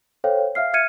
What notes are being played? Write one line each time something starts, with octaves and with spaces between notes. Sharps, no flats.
A4 C5 C#5 F5 G5
E5 F5 F6 C7
E5 F6 G#6 C#7 D#7